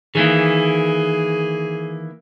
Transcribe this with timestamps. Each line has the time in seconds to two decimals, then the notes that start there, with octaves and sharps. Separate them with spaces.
0.15 D#3 E3 A#3 G#4